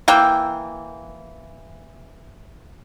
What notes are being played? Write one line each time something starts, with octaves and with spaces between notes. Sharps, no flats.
E3 A#3 G5